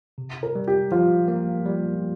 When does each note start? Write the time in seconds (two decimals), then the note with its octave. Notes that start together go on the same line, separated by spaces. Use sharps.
0.18 C3
0.43 A#4
0.55 G3
0.68 G4
0.92 F3 F4
1.28 A#3
1.65 G3